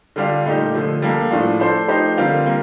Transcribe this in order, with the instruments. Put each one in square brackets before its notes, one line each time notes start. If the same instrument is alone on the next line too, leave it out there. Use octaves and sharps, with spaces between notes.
[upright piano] D3 G3 D4 F4
A#2 A3 D#4 G4
D3 F3 A3
G3 A#3 D4 A4
A2 F3 A3 D4 F4
A3 D4 A4 C5
F3 A3 D#4 G4 C5
D3 G3 C4 F4 A#4
G3 A#3